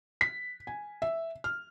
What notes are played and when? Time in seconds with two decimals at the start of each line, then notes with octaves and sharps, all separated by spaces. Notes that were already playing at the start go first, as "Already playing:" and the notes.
0.21 B6
0.67 G#5
1.02 E5
1.44 F6